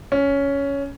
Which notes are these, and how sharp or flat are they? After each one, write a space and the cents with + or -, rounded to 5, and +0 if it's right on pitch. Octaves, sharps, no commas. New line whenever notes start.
C#4 +10